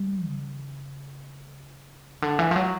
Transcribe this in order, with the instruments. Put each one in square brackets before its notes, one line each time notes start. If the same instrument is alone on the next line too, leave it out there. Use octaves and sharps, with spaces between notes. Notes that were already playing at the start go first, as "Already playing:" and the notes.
Already playing: [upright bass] G3
C#3
D3
E3
F3
F#3